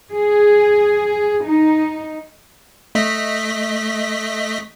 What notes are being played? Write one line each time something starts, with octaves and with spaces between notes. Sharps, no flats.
G#4
D#4
A3 D#5 B6